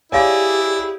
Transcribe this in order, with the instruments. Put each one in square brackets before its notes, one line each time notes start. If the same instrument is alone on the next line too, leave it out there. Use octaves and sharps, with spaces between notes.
[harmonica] E4 [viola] G4 G#4 [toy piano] C#5 F5 [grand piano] D5 G#5